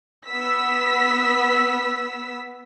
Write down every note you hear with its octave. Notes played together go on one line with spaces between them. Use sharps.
B3 E6 B6